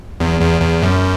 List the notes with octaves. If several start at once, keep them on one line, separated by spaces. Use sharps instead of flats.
E2
E2
E2
F#2